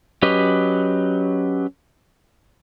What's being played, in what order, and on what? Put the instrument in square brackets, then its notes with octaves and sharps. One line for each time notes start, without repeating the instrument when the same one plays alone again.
[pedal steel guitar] F#3 C#4 G4 B4 D#5